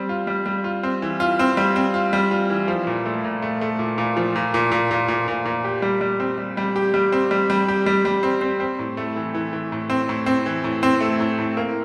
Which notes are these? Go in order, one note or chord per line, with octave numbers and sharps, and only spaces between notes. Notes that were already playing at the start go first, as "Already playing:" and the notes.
Already playing: G3 C4
F4
G3
G3
F4
C4
E3
F4
C4
G3
C4
F4
G3
F4
E3
F3
A#2
A3
A#2
A3
A3
A#2
A#2
F3
A#2
A#2
A#2
A#2
A#2
A#2
A#2
G4
G3
G3
C4
G3
G3
G4
G3
C4
G3
G3
G4
G3
G3
C4
C4
C4
A2
A3
E3
E3
E3
A2
C4
A2
C4
E3
A2
C4
A3
A2
A2
A#3